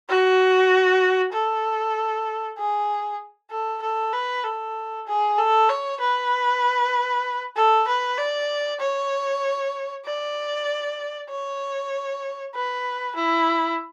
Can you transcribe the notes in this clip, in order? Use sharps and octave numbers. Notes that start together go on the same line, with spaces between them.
F#4
A4
G#4
A4
A4
B4
A4
G#4
A4
C#5
B4
A4
B4
D5
C#5
D5
C#5
B4
E4